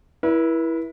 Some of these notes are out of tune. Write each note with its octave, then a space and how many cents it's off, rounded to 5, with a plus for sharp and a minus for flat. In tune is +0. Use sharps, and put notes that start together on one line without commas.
E4 +0 B4 -45